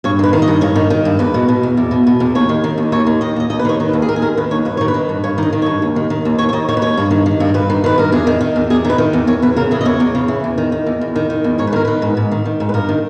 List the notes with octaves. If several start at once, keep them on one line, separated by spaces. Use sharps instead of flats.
G2 C#5
D#3 B4
D#3
D#5
G2
G2 C#5
D#3
D#3
G2
E2 B4
B2
B2
E2
E2
B2
B2
E2
D#2 C#5
D#3
D#3
D#2
D#2 C#5
D#3
D#3 D#5
D#2 D#5
D#2 D#5
B4
D#3 C#5
D#3
B4
D#2
G#4
D#2 A#4
G#4
D#3 A#4
D#3 B4
D#2 C#5
G2 B4
D#3 C#5
B4
D#3
G2
G2 C#5
D#3 D#5
D#3
G2 C#5
D#2
D#3
D#3
D#2
D#2 C#5
C#5
D#3 D#5
D#3 C#5
B4
D#2 C#5
G2
D#3
D#3
G2
G2 B4
D#3
D#3 B4
G2 A#4
E2 G#4
D#3
D#3
E2
E2 G#4
D#3
B4
D#3
E2
E2 C#5
E2 B4
C#3 A#4
E3 G#4
D#5
E2 C#5
E2
C#3
E3
E2
D#3
D#3
E2
E2
D#3
D#3
E2
G#2 C#5
B4
D#3 A#4
D#3 B4
G#2
G#2
D#3
D#3
G#2
B4
G2 A#4
D#3